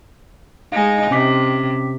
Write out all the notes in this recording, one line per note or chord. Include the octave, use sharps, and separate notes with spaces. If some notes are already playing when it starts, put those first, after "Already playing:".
G#3 D#4 F5 G#5
C3 C#4 D6 B6